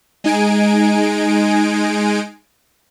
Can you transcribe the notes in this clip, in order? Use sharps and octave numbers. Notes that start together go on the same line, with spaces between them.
G#3 D#4 G#5 D7